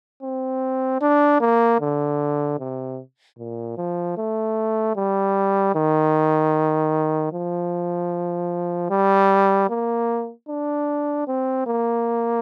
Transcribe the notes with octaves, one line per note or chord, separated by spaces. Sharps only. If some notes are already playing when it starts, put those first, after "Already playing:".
C4
D4
A#3
D3
C3
A#2
F3
A3
G3
D#3
F3
G3
A#3
D4
C4
A#3